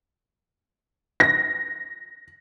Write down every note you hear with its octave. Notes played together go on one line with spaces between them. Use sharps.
A#6